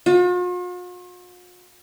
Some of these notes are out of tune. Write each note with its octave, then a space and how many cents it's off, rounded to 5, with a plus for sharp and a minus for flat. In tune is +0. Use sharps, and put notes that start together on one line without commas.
F4 +45